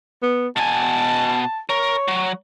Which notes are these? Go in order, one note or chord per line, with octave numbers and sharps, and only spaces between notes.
B3
B2 G#5 A5
A#4 C#5
F#3